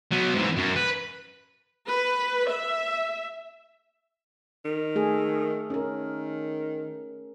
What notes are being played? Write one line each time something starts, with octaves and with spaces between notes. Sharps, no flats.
F#3 B3
G#2 E3
F#2
B4
B4
E5
D#3
A3 G#4 A4
D#3 C#4 A#4